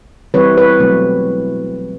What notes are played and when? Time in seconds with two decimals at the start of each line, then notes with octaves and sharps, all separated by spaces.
0.34 E3 G3 C4 E4 B4 C#5
0.57 B4 C#5
0.80 B2 F#3 A3 C4